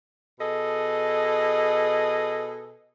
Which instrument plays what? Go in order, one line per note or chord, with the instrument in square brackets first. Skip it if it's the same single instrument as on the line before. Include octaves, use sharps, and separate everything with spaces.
[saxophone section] B2 G#4 A4 D#5